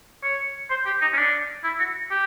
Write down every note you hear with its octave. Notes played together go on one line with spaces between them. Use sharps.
C#5
C5
G4
D#4
C#4
D4
E4
F#4
G4